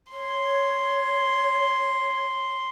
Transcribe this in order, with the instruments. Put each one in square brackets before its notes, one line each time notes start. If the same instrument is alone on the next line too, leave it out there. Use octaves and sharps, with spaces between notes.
[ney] C#5 [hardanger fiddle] C6